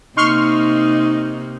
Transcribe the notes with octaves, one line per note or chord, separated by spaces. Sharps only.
C3 A#3 D#4 C6 C#6 F6